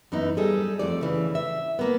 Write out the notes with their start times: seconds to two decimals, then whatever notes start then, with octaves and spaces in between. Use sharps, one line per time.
0.12 F#2 E3 B3 D#4
0.37 G3 G#4 A4
0.79 F2 A3 D5
1.01 C#3 E3
1.35 E5
1.79 A#3 B3